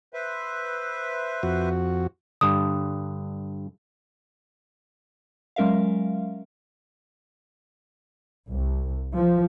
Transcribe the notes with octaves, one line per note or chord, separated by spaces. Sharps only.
B4 C5 E5
F2 F#4
G2 D3 D#6
F#3 G#3 C#4 A#4 E5 F5
C2
F3